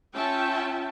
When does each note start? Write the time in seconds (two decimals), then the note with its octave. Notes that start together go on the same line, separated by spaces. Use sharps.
0.15 C#4 F4 E5 G5 A5